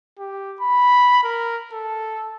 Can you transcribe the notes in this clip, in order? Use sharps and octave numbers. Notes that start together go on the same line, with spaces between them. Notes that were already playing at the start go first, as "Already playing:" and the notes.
G4
B5
A#4
A4